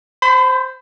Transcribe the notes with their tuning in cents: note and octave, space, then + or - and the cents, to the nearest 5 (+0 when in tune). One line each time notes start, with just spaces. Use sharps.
C5 +0 B5 +40